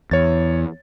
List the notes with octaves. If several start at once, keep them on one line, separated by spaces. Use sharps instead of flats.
E2 C#5 A6